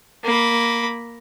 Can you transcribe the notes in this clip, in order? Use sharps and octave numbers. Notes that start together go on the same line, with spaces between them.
A#3 B5